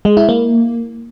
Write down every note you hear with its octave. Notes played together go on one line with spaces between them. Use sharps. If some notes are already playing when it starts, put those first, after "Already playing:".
G#3
E4
A#3